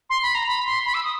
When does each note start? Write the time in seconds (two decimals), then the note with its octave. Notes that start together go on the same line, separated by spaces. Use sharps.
0.10 C6
0.23 B5
0.35 A#5
0.47 B5
0.66 C6
0.85 B5
0.94 E6
1.04 D#6